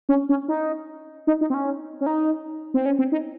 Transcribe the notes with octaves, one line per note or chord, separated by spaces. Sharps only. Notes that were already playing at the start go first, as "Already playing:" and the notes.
C#4
C#4
D#4
D#4
D#4
C4
C#4
C#4
D#4
C4
C#4
C4
D#4